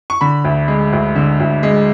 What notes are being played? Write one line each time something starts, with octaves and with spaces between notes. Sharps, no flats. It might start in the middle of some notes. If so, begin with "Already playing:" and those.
C#6
D3 B5
D2
G#3
D2
D3
D2
G#3